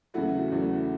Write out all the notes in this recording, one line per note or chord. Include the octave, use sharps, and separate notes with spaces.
E2 C#3 F#3 A3 E4 F#4
E2 C#3 F#3 A3